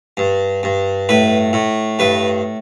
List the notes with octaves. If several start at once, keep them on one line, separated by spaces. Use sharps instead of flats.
G2
G2
A2 B4
A2
G2 B4